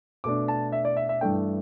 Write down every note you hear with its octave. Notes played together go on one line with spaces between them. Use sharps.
B2 A3 D4 D6
A5
E5
D5
E5
E5
G2 E3 A3 D4 G5